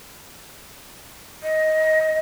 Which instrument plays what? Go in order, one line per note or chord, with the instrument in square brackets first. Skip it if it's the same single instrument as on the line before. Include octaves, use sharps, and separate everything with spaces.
[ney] D#5